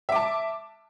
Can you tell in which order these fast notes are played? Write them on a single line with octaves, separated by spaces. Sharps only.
E5 D6 A5